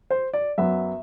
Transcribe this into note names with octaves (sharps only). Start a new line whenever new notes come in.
C5
D5
F#2 F#3 B3 E5